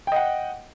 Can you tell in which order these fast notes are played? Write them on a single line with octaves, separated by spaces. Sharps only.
G5 D#5 F#5